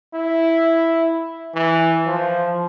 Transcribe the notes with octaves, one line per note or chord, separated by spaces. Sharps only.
E4
E3
F3